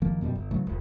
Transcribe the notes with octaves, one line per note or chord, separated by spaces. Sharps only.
F#1 D#3 F3 A#3
F#2 B2 F3 G3
G1
C#3 E3 F#3 A3
D#1 C2